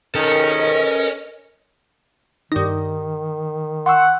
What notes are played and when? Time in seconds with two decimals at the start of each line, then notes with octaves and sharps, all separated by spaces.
0.15 D#3 C#4 A4 A#4 D#5
2.52 G2 D#3 D#4
3.86 F#5 C6 C#6 E6